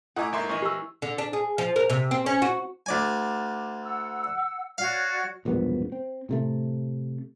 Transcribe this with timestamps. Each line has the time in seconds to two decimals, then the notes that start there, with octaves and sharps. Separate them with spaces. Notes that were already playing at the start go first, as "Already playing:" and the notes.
0.16 A2 D#4 E4 F#5 G#5 D6
0.33 G1 A#4 E5 C6
0.49 A#1 E3 C#4 D#5
0.62 G4 E6
1.02 D3
1.18 D4
1.33 G#4
1.58 F3
1.76 A#4
1.90 C3
2.11 C4
2.26 C#4
2.42 F#4
2.86 D2 D5 G#5
3.82 F#5 E6
4.78 F#4 C#5 D5 F5
5.45 E1 A#1 G2 B3
5.92 C4
6.29 A2 C3 A3